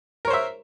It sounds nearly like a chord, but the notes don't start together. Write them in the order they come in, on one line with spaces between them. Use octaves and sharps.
A#4 C#5 C5 E5